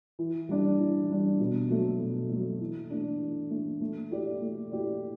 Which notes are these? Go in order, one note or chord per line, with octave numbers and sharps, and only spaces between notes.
E3
G3 D4
E3
G3 D4
B2
F#3 A3
B2
F#3 A3
E3
A3 D4
E3
A3 D4
A3
E4 G4 D5
A3
E4 G4 D5